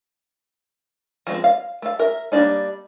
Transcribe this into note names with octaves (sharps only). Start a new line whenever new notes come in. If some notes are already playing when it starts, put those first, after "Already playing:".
F3 G#3 B3 C4
F5
A3 F5
A#4 E5
G3 A#3 C4 D4 D#4